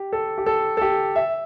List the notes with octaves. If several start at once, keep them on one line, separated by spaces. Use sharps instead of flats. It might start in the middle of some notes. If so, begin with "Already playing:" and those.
Already playing: G4
A4
G4
A4
A4
G4
E5